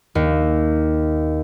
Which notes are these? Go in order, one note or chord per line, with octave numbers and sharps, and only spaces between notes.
D#2